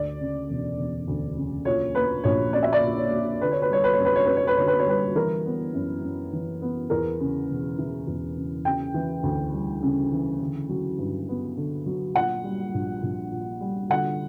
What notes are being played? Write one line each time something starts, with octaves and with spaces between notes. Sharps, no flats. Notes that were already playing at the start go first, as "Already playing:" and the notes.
Already playing: D2 D5
C#3
E1
E1
D2
C#3
A#2 C#5
A#3 B4
A#1 C#5
C#4 D5
E5
D5
A#2
C#5
A#3
D3 B4
C#5
B4
G3 C#5
B4
C#5
F#2
B4
C#5
C#4 B4
C#5
B4
D3 C#5
B4
C#5
G3 B4
E3 A#4
B3
F#2
F#2
E3
B3
E2 A#4
C#3
E1
E3
E2
C#3
C#3 G5
E3
D2
G3
C#3
E3
D3
F#3
G2
B3
D3
F#3
A#2 F#5
G3
A#1
A#1
A#2
G3
D3 F#5